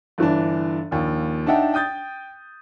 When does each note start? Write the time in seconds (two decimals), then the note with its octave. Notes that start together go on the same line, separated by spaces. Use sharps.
0.18 G1 E3 D4
0.91 A#1 D#2
1.46 D4 D#4 E5 F#5 G5 A5
1.74 G5 D#6 G6 A6